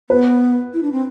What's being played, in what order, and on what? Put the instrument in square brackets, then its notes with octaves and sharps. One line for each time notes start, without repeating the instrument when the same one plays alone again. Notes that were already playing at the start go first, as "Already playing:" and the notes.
[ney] B3 [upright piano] B4
[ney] E4
D4
C4